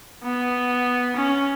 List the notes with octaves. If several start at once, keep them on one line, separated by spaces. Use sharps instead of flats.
B3
C#4